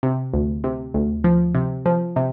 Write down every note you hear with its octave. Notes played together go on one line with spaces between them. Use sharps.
C3
D2
C3
D2
F3
C3
F3
C3